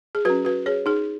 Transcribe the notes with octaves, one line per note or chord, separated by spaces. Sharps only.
G#4
F#3 C#4 F#4 B4
F#4 B4
G#4 C#5
D#4 G#4